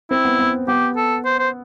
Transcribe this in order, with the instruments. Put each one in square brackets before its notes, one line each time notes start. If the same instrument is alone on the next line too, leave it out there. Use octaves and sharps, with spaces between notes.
[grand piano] C4 [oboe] E4
[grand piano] B3
B3
[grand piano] B3 [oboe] G4
[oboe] A4
C5
C5